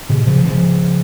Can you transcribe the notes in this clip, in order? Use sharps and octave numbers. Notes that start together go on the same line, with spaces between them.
A#2 C#3
C#3 F3
C#3 F3